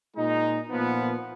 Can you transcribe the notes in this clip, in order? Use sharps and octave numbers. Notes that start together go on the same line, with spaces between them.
A#2 G#3 D#4
A#2 F3 B3